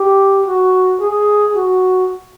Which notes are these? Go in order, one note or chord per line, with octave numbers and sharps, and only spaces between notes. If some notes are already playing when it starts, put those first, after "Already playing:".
Already playing: G4
F#4
G#4
F#4